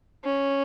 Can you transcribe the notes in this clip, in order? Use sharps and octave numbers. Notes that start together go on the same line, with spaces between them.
C#4